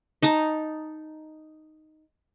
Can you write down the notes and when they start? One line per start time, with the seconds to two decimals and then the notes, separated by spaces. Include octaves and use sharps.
0.22 D#4 A5 A#5